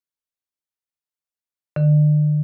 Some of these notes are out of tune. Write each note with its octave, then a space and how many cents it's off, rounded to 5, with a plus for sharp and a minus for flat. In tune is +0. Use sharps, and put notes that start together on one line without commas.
D3 +40